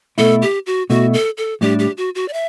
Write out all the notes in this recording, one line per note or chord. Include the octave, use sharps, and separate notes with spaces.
B2 A3 E4 A4
G4
F#4
B2 A3 E4 F#4
A4
A4
A2 G3 D4 G4
G4
F#4
F#4
D5
E5